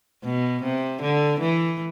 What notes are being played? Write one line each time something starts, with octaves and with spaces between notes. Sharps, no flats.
B2
C3
D3
E3